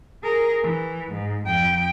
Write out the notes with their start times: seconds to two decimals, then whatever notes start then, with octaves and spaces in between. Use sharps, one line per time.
0.23 G#4 A#4
0.63 E3
1.12 G#2
1.46 F2 G5